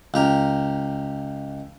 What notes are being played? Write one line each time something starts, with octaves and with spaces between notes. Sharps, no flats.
C#2 G4 A#4